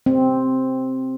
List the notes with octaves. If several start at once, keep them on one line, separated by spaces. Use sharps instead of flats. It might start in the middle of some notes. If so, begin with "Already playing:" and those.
C4